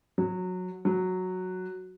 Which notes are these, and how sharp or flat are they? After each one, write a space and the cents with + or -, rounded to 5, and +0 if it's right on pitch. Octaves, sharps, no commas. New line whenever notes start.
F#3 -15
F#3 -5